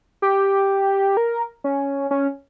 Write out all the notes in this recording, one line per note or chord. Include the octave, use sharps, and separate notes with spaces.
G4
A#4
C#4
C#4